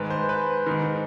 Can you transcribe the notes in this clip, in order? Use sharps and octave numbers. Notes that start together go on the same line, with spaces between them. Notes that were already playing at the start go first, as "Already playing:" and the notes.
Already playing: G#2 D#3 B4
C5
B4
G#2 D#3